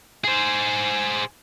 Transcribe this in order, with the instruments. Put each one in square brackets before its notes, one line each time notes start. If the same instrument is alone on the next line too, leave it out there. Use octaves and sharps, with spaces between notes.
[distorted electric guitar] G#4 C5